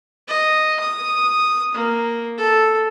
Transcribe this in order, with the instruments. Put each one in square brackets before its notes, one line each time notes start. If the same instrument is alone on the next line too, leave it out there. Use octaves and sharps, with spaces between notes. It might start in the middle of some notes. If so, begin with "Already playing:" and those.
[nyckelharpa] D#5
D#6
A#3
A4